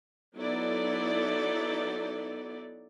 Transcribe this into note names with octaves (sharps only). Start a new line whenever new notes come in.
F#3 B3 D#4 E4 A4 D5